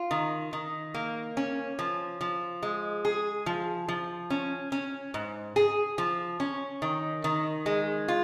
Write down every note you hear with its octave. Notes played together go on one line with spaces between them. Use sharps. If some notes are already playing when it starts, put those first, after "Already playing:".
Already playing: F4
D#3
D#3
A#3
C#4
F3
F3
G#3
G#4
F3
F3
C#4
C#4
G#2
G#4
F3
C#4
D#3
D#3
G#3
F4